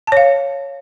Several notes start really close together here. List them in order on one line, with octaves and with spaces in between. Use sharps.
A5 C#5 F5